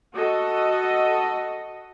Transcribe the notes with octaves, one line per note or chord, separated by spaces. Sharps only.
F#4 A4 D#5